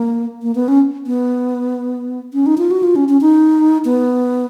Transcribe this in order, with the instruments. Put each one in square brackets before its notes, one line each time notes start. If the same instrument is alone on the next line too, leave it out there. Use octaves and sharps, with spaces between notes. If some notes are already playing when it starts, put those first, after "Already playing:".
Already playing: [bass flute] A#3
A#3
B3
C#4
B3
C#4
D#4
F4
F#4
F4
C#4
C#4
D#4
B3